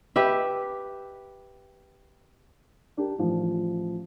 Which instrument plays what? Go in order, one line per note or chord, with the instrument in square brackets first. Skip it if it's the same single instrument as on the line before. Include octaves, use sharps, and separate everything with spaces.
[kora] G4 B4 E5
[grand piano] D4 G4 A#4
A1 F3